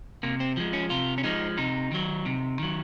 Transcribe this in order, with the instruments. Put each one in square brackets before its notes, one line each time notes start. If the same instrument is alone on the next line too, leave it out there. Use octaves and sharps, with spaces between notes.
[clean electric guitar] C3 A#3
C4
F3 G#3
C#4
C3 F4
C#4
F3 G#3 D#4
C3 D#4
D#3 F#3
C3
D#3 F#3